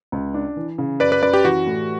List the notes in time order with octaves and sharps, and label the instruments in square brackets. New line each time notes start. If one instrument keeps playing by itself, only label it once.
[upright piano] C#2
D4
E3
C#3
[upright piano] F#2 [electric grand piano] B4 D5
[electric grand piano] B4 D5
[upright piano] F#2 [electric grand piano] B4 D5
[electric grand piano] G4
[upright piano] E3 [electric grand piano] F#4
[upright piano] A2